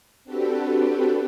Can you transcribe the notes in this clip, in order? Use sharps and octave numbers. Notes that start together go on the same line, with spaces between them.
C4 D4 F#4 G4 A4 B4